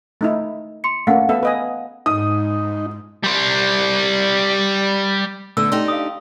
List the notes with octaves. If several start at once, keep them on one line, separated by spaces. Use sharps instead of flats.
A3 D#4 E4
C6 C#7
A3 A#3 C#4 F5 F#5
B3 A4 E5
B4 D#5 G#5
G#2 D#4 D#6
G3 C5
D3 A3 B3 E6
D4 D#4 G4 C6
F5 D#6